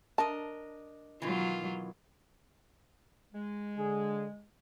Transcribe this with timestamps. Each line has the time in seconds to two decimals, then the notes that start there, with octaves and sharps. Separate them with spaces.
0.18 D4 A#4 D#5 A5
1.22 B2 D#3 E3 F#3 F4
3.33 G#3
3.78 D3 G#4